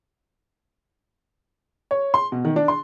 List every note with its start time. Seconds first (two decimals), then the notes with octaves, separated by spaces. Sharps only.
1.91 C#5
2.14 C6
2.32 B2
2.45 D#3
2.56 D4
2.68 C6